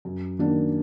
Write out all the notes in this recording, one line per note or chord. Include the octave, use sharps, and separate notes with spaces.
F#2
D#3 F#3 A#3 D4